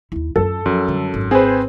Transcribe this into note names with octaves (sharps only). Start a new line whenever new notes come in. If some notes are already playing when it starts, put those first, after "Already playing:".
D#2 E4
F#2 F4 A4
F#2 F3
D3 G3
G#1
C4 G#4 B4 C5